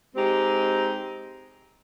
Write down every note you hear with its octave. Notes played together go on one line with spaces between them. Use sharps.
G#3 C4 D#4 G4